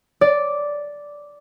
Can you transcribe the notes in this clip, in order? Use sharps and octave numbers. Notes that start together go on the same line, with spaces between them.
D5